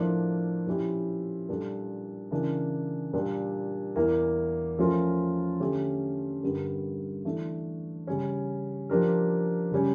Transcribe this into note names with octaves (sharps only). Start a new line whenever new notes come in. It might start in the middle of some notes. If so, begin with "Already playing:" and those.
Already playing: A2 F3 A#3 D4
A#2 F3 C#4 E4 G4
A#2 G3 D4 A4
C#3 E3 A#3 D4
A#2 G3 D4 G4
E2 E3 A#3
F3 A3 C#4 F4 A#4
D3 A3 C#4 G4
G2 D3 G3 A#3
E3 A3 D4
C#3 G3 C#4
F3 A#3 D4 G4 A#4
C#3 G3 C#4